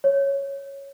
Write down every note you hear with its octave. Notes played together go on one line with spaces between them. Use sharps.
C#5